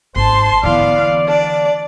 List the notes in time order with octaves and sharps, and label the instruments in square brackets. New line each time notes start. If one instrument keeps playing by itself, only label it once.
[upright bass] G#1 [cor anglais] C5 [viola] A5 C6
[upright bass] D3 E3 [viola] B3 F5 [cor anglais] D5
[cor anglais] D4 [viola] D5